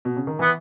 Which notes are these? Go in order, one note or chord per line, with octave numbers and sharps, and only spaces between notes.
B2
C#3
D#3
E3 B3